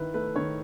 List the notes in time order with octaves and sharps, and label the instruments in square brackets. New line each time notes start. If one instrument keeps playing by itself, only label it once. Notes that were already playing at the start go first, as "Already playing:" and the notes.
Already playing: [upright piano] D#3 E4 B4
A3 B4
D#3 C#5